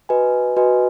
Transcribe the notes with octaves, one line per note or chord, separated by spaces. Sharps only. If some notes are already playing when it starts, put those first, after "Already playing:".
F#4 B4 D#5 G#5
F#4 B4 D#5 G#5